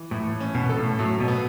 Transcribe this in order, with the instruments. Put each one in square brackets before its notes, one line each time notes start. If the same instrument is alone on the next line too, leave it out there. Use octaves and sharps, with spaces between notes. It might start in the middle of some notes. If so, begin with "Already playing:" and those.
Already playing: [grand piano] E3
[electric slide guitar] A2 [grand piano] E3
[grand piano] C#4
[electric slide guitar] B2
[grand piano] A4
[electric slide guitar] A2
[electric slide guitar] A2 [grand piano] F#3
[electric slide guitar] B2
[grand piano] B3